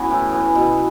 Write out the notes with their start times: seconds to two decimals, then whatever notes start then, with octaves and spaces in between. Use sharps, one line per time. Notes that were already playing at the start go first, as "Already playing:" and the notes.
Already playing: E3 B3 C#4 F#4 G#5
0.10 A2
0.32 E3 B3
0.55 B2